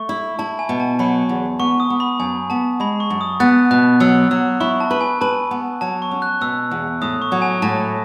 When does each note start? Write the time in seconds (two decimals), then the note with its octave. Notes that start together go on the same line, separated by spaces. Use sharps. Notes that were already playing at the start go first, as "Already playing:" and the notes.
Already playing: A3 C#6
0.09 E4
0.39 E4 A5
0.59 G#5
0.69 B2
0.80 A5
0.99 F#3 B5
1.29 E2
1.59 B3 C#6
1.80 D#6
1.90 B3
2.00 B5
2.20 F#2 G#5
2.50 B3 A5
2.80 G#3 B5
3.00 C#6
3.10 F#2
3.21 D#6
3.40 B3 F#6 A6
3.71 B2 F#6
4.00 F#3 E6
4.31 F#3 E6
4.60 E4 C#6
4.80 A5
4.91 B4
5.01 G#5
5.21 B4 A5
5.51 B3
5.81 F#3 A5
6.02 C#6
6.11 C#4
6.22 F#6
6.41 B2 E6
6.71 E2
7.02 A2 D#6
7.22 C#6
7.32 F#3
7.42 G#5
7.62 A2 A5